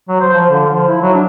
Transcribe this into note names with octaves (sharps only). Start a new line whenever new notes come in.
F#3
C5
F3
D3
F3
E4
F#3
D4